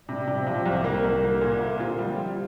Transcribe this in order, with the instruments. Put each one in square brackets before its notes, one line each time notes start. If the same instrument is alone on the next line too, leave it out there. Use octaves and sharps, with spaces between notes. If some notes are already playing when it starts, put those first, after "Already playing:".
[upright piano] C3 [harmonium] G3
[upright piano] C3
[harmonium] F3
[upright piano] C3
C2
[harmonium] C3 [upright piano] A#3
[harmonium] C3
[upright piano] C2 [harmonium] G3
[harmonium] F3
[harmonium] D3 [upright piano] A#3
[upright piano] A#2
[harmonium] C3
[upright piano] A#3
[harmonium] D3 [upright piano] F4
[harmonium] F3
[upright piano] G3
[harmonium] D3
[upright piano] F4
[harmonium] C3